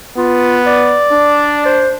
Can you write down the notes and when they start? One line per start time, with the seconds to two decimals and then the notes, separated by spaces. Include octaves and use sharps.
0.17 B3 F4
0.66 D5
1.12 D4
1.66 C5